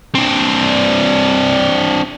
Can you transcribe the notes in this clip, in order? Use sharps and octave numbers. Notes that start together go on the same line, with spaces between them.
C4 D4